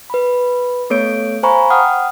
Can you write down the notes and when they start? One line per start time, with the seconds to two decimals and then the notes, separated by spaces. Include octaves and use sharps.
0.10 B4 B5
0.90 A3 B3 A4 C#5 G6 D7
1.43 C5 F5 G#5 A#5 B5 C#6
1.70 F#5 G5 D#6 F6